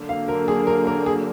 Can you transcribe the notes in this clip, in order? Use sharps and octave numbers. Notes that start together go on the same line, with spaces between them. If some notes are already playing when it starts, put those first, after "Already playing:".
Already playing: D3 F#3 A#3
F5
A#4
G#4
A#4
A#4
G#4